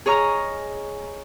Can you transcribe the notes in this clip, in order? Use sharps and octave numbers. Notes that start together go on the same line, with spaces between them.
G#4 C#5 D#5 A#5 F6